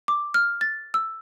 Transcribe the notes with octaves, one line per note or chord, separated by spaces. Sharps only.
D6
F6
A6
E6